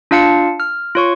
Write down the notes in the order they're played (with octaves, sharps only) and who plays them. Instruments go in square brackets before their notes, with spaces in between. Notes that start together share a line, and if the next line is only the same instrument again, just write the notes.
[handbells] D4 F4 F5 A5 C#7
F6
F4 C#5 C#6